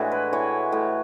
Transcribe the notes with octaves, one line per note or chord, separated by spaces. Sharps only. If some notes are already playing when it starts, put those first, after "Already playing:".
Already playing: A2 E3 G#3 D4 E4 F#4
B4
E3 C#5
A2